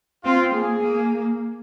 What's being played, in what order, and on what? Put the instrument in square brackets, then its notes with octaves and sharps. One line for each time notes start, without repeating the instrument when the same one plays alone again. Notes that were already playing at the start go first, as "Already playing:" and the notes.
[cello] C4 [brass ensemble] F4
[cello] A#3 [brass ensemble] G#4
[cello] A#3